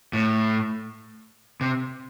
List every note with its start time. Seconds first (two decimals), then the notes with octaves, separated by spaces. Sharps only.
0.13 A2
1.61 C3